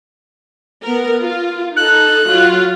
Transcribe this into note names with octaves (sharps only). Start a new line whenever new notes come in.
B3 A#4
F4
D#4 A4 F#6
F#3 F4